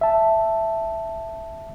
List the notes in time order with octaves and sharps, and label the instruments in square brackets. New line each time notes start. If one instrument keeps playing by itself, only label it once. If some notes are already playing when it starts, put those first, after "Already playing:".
[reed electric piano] E5 A5